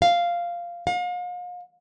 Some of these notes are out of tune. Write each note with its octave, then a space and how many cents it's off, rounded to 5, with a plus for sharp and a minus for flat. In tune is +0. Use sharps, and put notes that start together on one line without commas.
F5 -5
F5 +40